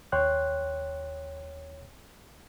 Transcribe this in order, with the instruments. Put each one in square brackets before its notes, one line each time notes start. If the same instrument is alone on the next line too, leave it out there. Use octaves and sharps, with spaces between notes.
[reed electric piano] D#2 C#5 G5 C6 F#6